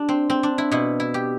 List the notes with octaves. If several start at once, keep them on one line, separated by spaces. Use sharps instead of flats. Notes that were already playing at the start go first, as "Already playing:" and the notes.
Already playing: D4 G4
C4
C4
D4
E4
B2 E4
E4
G4